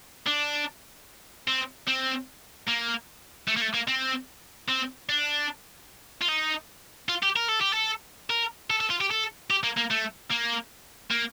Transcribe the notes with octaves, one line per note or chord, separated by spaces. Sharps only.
D4
C4
C4
A#3
A3
A#3
A3
A#3
C4
C4
D4
F4
D#4
F4
G4
A#4
A4
G4
A4
A#4
A4
A4
F4
G4
A4
G4
A#3
A#3
A3
A#3
A#3